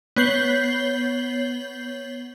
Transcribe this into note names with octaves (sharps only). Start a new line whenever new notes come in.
B3 C#5 G6 C7 F#7 G7